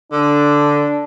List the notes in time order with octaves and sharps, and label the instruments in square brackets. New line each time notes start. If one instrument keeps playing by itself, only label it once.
[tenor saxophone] D3 [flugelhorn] D4